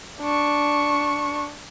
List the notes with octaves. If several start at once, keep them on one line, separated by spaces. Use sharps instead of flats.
D4 C#6